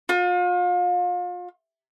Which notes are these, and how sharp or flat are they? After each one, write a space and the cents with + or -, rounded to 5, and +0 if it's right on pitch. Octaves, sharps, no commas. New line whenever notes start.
F4 +35